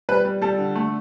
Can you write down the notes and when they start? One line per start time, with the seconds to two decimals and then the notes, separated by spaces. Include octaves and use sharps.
0.09 G3 B4
0.25 G3
0.42 G3 A4
0.58 D3
0.75 A3